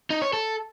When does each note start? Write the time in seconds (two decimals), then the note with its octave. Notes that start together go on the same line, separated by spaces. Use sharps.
0.10 D#4
0.22 C#5
0.33 A4